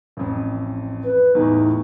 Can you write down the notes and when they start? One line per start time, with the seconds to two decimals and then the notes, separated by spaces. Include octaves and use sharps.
0.17 A1 F2
1.04 B4
1.35 E2 A2 D#4